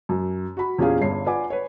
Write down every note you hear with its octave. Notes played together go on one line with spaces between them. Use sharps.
F#2
F#4 B5
E2 A#2 C#4 G4 G#4 F5
G1 G2 C#5 C7
F4 B4 D5 F#5 G#5 D6
B4 C#5